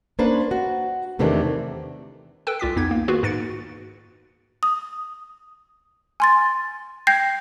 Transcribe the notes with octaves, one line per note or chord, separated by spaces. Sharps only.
A#3 C#4 D4 B4 C5
F#4
E2 C3 D#3 E3 A3 D4
A4 B4 G5 G#5
C2 F4 D6 B6
F2 B3 D#4 G#6
A#3
D#3 A#3 F4 F#4 G#4 B4
G#2 B4 A6 C#7 D7
D#6
G#5 C6 A6
G5 G6 G#6 A#6 C7